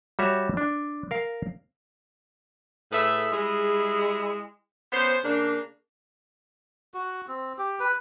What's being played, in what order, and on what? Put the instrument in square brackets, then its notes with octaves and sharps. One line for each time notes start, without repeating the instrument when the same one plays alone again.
[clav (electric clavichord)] G3 F#4 C#5 E5
D4
A#4 F5
[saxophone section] A2 G#4 A4 B4 E5
G3 G#3 E4 G#4
B3 C#4 C5
C#3 A#3 D4
[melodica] F#4
C4
G4
B4